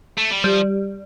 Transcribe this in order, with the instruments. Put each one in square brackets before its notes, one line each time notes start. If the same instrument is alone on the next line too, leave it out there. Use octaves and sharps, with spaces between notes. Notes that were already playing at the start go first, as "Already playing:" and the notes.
[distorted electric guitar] A3
G3
[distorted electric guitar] F3 [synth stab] G3